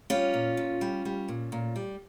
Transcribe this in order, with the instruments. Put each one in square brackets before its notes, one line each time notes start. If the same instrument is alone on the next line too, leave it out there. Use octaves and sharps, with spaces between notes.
[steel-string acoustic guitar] G3 C#4 F4
A#2
A#2
G3
G3
A#2
A#2
G3